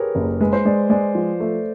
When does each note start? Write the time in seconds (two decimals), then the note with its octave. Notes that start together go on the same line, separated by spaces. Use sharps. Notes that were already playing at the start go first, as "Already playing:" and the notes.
Already playing: G4 G#4 A#4 B4 C#5
0.15 F#1
0.40 G#3 B4
0.53 C5
0.65 G#3 D5
0.90 G#3 D5
1.15 F3
1.40 A3